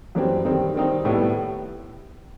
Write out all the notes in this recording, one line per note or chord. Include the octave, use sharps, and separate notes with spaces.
F#2 E3 G3 C4
D#3 G3 C4 D#4
D#3 G3 C4 D#4
A2 G3 B3 E4